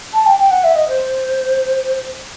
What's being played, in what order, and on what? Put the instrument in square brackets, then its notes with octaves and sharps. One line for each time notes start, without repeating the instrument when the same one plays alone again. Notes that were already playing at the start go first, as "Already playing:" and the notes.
[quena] A5
G5
G5
F#5
E5
D#5
C5